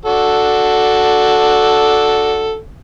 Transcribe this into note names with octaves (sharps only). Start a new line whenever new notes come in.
D4 F#4 A4